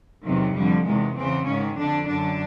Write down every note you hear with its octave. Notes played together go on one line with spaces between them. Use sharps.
E2 C3 D#3 F#3
F2 D3 G3
E2 C3 D#3 G#3
E2 C#3 E3 C4
G#2 D#3 C#4
F2 D3 D4
F#2 D3 D4